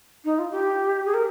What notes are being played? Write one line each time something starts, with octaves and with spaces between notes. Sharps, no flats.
D#4
F4
G4
G#4
A#4